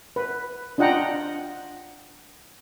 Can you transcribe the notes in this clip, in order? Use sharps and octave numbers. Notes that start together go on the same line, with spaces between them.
B4
D4 F4 D#5 F#5 G5 A#5